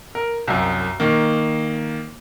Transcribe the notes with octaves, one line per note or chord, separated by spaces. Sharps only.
A#4
C2 F#2
D#3 A#3